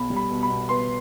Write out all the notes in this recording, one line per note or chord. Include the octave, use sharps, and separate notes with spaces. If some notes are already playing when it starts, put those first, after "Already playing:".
Already playing: B1 B5
G3
B5
B2
B5
B2
B3 C6